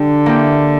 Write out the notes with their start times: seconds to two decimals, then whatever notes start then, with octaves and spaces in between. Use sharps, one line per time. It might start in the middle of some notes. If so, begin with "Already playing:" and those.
Already playing: D3 G3 D4 G4
0.26 A#3 E4 G4